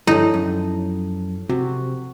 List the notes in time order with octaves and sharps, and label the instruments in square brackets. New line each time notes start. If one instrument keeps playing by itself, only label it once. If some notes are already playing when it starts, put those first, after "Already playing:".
[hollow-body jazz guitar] G2 D3 [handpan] F3 A4 [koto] D#4 [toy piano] E4 C#5
[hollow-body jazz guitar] F#2
[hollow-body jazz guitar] C3 [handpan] F#4